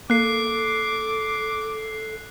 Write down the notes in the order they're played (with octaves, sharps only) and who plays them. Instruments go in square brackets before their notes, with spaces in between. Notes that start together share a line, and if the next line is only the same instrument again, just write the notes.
[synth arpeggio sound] A#3 [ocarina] A4 [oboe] D6 [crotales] F#6 C7